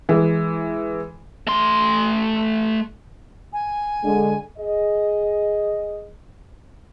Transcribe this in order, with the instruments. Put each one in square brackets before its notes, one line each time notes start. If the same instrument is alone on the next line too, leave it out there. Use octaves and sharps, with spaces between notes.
[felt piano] E3 G#3
[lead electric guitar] A3 C6
[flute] G#5
[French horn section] D3 G#3
G#4 D#5